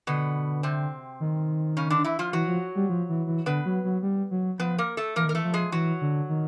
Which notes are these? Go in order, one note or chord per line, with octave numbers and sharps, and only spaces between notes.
B2 D3 B3
C3 C4
D#3
C#3 C#4
D3 D4
E3 E4
F3 F4
E3 F#3 F#4
F3
G3
F3
E3
E3
D3 B3 B4
F#3
F#3
G3
F#3
F3 B3 B4
A#3 A#4
A3 A4
E3 A#3 A#4
D#3
A#4
E3 A3 A4
F3
G#3 G#4
E3 F#3 F#4
D3
D#3